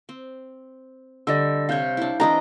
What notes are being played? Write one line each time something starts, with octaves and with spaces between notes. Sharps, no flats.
C4
D3 G3 D5 D#5 E6
C3 C#5 F5 G6
D4 E4
E3 C4 D4 D#5 A#5